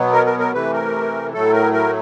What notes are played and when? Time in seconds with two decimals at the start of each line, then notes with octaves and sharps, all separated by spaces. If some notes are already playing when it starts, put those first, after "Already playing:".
Already playing: B2 F#3 B3
0.13 A#4
0.26 A#4
0.39 A#4
0.53 C3 E3 A3 B4
0.73 A#4
1.34 A2 F#3 A3 A4
1.53 A#4
1.73 A#4